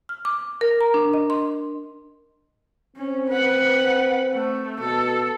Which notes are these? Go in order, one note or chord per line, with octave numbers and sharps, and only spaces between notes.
F6
D6
A#4
A#5
D4
D#5
C6
C4 C#4
B4 F#5
A3
B2 A4